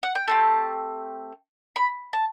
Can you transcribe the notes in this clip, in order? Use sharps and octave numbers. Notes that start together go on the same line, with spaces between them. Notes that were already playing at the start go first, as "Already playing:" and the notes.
F#5
G5
A3 C4 G4 A5
B5
A5